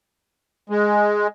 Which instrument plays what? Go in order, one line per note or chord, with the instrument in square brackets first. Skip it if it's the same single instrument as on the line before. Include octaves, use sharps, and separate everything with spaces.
[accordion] G#3